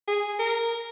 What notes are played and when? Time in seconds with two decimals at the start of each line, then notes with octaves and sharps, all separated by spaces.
0.08 G#4
0.39 A#4